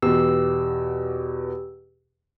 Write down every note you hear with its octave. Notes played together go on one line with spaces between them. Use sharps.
E2 B2 G4 E6